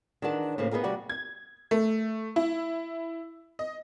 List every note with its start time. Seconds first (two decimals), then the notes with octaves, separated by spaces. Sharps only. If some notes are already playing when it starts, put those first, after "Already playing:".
0.22 D#3 E3 D4 G#4 F#5 A5
0.58 A2 C#3 A#3 G#4 C5
0.71 B3 D#4 G#4 A#4 F5
0.84 D2 C3 G3 F#4 D5 F#5
1.09 G#6
1.71 A3
2.36 E4
3.59 D#5